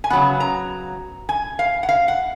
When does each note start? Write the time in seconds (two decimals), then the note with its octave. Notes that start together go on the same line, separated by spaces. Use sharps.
0.04 G#5
0.10 C#3 F#3 B3 F#5
0.40 A#5
1.29 G#5
1.59 F5
1.83 F#5
1.89 F5
2.08 F#5